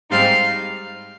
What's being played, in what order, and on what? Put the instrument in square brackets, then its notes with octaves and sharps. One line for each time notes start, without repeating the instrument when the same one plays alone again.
[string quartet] G#2 G3 C4 D#4 F5